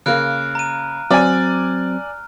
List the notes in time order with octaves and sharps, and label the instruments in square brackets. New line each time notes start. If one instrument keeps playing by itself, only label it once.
[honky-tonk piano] C#3 A#3 [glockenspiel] F6 F#6 D7
[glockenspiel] A#5 D#7
[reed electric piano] F#3 C4 [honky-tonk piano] D5 G#5 [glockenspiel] F6